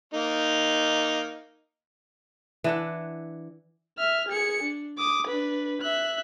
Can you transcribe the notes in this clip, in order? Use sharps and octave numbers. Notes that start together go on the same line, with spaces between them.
A#3 D#4
E3 D4 F#5
E5 F6
G#4 C#7
D4
D6 D#6
D4 B4
E5 F#6